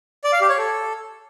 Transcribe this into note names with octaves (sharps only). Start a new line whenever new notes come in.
D5
F5
G4
C#5
A4